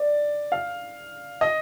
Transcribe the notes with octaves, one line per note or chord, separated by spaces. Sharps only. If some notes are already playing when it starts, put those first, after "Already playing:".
Already playing: D5
F5
D#5